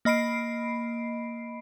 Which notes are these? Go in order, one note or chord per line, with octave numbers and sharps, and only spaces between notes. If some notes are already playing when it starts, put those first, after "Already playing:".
A#3 D#5 B5 C7 D7